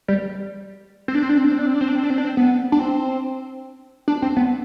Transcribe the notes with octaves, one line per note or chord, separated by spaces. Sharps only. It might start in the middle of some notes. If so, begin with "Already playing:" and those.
G3
C4
D4
C4
D4
C4
D4
C4
D4
C4
D4
C4
D4
C4
D4
C4
D4
C4
B3
D4
C4
D4
C4
B3